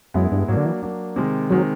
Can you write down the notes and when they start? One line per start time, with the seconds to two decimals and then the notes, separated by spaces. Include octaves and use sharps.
0.14 F#2 G#3 B3 E4
0.32 G2
0.48 G#2 F#3 A#3 D4
0.57 D3
0.66 E3
0.82 F#3 A#3 D4
1.16 C3 D#3 G#3
1.50 C3 D#3 F#3 G#3